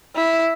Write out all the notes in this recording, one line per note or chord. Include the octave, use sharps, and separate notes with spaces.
E4